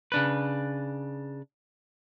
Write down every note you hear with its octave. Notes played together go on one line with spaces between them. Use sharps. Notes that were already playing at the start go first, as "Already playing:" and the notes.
C#3 D4 B4